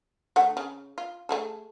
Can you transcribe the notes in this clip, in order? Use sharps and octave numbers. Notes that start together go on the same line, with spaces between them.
D3 A3 F#5
C#3
F4
A3 G#4 A4